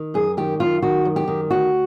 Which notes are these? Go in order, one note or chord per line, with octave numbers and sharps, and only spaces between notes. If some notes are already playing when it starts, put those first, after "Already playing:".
Already playing: D#3
F#2 G#4
D#3 G4
F#2 F4
D#3 F#4
F#2
G4
D#3
D2 F#4